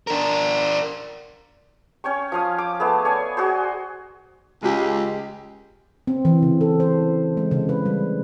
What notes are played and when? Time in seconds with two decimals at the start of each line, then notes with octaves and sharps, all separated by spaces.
0.07 D4 A#4
2.04 C#4 C#5 G5 C#6
2.32 F3 F5 D#6
2.58 D6
2.80 A3 B3 G#4
3.05 C#5 D5 G#5
3.37 F#4 G#4 C5
4.63 C#2 G#3 G4
6.07 C4
6.25 E3
6.42 C#3
6.61 A4
6.80 C5
7.37 G#3
7.51 C#3
7.69 B4
7.86 G3